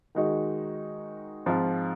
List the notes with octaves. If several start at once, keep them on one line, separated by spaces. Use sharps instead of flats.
D#3 G#3 D#4 F#4
G#2 F3 C4 F4